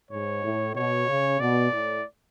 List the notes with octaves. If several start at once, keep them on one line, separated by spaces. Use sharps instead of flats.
G#2 C#5
A2
B2 C#5
C#3
B2 D5
A2